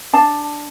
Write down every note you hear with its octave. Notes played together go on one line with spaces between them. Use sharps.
D4 A5